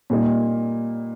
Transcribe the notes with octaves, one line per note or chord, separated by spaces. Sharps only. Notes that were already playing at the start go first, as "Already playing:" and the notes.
A#2 G3 A#3 D#4